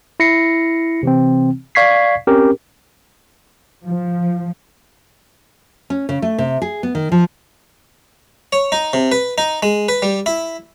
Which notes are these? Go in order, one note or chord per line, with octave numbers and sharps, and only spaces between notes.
E4 A#6 C7 C#7
C3 E3 C4
D5 F5 C#6 G#6 B6 C7
C4 C#4 G4 A#4
F3
C#4
C#3
A3
C3
G#4
B3
D#3
F3
C#5
D#4
C3
B4
D#4
G#3
B4
G3
E4